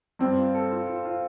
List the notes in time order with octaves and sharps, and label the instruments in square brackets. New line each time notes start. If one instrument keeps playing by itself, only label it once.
[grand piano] G2 [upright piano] C4
[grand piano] F4
A4
F4
F4
F4